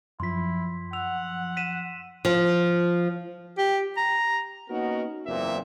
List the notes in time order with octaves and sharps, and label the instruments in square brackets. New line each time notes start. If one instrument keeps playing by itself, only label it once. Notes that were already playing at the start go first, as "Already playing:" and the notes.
[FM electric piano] F#2 F3 [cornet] E4 [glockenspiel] C6 B6
[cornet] F#5 [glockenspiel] E6 F7
[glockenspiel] B6 D#7 E7
[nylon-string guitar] F3
[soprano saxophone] G4
A#5
[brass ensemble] A#3 B3 C#4 D#4 F#4 A#4
F#1 E2 A#2 A#3 C4 E5